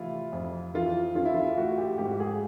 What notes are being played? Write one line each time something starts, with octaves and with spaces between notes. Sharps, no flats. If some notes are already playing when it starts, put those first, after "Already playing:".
Already playing: C3 E3 A3 E4 F4
F2
E3 F4
C#4 F4
E4
F4
A3 F#4
G4
G#2 G4
G#4